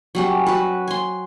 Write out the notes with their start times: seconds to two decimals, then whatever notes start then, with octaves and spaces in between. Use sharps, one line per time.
0.15 F#3 G3 C#4
0.46 F#4 B4
0.88 G#5 C6